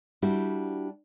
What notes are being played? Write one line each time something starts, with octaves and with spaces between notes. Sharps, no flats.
G3 D4 E4 F#4 G4